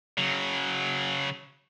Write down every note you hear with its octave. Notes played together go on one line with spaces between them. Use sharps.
C#3 F#3